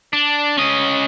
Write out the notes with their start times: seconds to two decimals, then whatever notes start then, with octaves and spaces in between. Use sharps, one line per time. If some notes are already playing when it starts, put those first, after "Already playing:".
0.13 D4
0.58 C#4 D#5